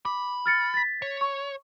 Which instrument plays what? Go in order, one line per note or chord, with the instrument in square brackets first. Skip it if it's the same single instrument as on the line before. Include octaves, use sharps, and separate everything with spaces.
[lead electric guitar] B5 [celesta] D6
[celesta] F6 A6 C#7
A6 B6
[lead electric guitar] C#5
[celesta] C#6